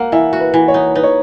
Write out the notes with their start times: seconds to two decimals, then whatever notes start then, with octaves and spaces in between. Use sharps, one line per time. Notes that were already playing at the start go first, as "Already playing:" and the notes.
Already playing: A#3 F#4 F#5
0.12 E3 E5
0.33 F#4
0.40 B4
0.54 E3
0.68 C#5
0.74 D#4
0.95 D#4 B4
1.03 C#5